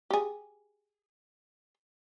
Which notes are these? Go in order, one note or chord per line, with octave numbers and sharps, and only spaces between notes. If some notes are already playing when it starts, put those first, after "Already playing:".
G4 G#4